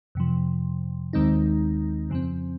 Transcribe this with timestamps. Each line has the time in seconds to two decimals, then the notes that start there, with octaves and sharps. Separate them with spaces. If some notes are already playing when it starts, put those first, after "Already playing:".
0.15 F2 C3 F3
1.13 D#2 D#3 G#3 C4 D#4
2.10 F2 C#3 F3 C4